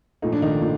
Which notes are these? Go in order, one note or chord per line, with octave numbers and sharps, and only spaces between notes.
A#2 F3 A3 D#4
D4
D#3 D#4
A#2